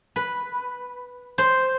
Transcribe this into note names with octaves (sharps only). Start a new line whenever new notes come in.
B4
C5